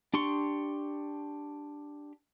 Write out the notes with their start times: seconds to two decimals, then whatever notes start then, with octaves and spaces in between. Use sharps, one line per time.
0.14 D4 G4 C6 C#6